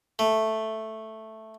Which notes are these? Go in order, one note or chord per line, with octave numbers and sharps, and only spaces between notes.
A3